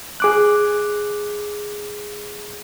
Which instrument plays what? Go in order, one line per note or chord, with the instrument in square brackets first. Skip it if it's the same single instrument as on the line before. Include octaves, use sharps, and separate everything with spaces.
[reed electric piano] G#4 D6 F#6